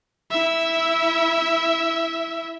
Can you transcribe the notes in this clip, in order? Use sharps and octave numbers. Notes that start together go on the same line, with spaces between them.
E4 E5